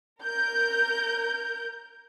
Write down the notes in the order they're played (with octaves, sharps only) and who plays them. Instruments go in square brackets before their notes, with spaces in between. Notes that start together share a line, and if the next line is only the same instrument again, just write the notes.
[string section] A#4 G6